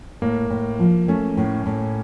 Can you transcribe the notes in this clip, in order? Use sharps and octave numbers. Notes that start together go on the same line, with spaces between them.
A2 A#3
A2
F3
A3 C#4
A2
A2